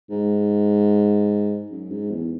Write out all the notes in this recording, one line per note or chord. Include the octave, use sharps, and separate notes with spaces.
G#2
F#2
G#2
E2